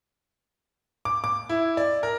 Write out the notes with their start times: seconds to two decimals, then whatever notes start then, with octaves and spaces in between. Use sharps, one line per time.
1.05 D6
1.24 D6
1.49 E4
1.77 D5
2.03 A#4